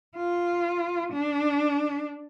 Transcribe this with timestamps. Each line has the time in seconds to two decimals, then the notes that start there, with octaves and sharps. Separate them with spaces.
0.16 F4
1.13 D4